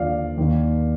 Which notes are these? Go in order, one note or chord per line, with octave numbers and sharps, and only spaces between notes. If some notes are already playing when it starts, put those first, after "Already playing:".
Already playing: D#2 D3 F3 D5 F5
D#2 D#3